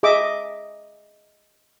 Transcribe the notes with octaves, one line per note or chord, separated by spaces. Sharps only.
G#4 D#5 E5 D6